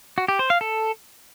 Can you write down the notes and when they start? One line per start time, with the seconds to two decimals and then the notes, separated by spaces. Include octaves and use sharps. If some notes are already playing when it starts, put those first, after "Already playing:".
0.18 F#4
0.28 G4
0.39 C5
0.50 F5
0.61 A4